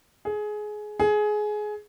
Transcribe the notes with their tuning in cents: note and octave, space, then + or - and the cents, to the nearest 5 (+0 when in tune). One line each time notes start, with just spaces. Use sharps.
G#4 +20
G#4 +20